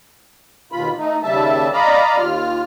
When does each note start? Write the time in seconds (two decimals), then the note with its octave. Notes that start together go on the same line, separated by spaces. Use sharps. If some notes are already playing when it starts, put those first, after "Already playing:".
0.72 D#2 B2 F4 B5
0.98 A3 D#4
1.23 D#2 C#3 G3 E5 A5
1.73 D5 D#5 F5 A#5 B5
2.17 D#2 F4 F6